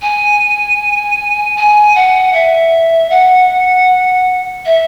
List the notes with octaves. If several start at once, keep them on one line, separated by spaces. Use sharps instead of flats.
G#5
G#5
F#5
E5
F#5
E5